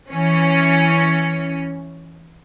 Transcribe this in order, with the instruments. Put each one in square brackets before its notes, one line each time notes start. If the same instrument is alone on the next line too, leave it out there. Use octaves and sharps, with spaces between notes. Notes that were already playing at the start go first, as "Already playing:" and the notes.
[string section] E3 C#4